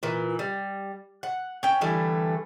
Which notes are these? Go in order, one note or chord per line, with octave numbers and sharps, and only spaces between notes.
A#2 E3
G3
F#5
C#4 G5
D3 E3 G3 A3